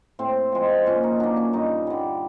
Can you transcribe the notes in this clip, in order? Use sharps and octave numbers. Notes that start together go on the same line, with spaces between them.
A2 C4
F3 G#3
A#2 C#4
D#4
F#3 A#3 D4
C#4
G2 D#4
D3 G3